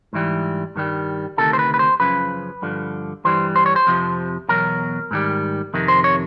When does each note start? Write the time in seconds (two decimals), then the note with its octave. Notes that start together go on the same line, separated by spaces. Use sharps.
0.13 G#2 E3 G3
0.76 G2 D#3 G3
1.38 D2 C3 D#3 A4
1.53 C5
1.59 B4
1.74 B4
1.79 C5
2.00 F#2 C#3 F3 B4
2.62 G2 D3 F3
3.24 G2 E3 G3 C5
3.56 C5
3.66 C#5
3.76 C5
3.87 F2 C3 F3
4.49 E2 B2 F#3 A#4
5.11 G#2 D#3 G3
5.74 F2 C3 D#3
5.88 C5
6.04 C#5